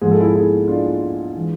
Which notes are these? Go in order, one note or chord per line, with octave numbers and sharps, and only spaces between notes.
G#2 F3 G#3 G#4
A4
E4 G#4
E4 G#4
D4 F4
E3 G#3